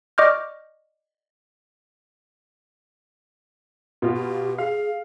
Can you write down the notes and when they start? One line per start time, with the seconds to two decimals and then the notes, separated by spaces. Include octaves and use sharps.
0.18 D5 D#5 C#6 D6 F6 G6
4.02 B2 F4
4.16 G4
4.58 G#4 F5